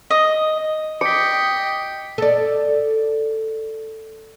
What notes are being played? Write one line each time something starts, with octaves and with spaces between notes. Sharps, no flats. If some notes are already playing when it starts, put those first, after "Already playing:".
D#5
D#5 G5 D6 B6 C#7
A4 D5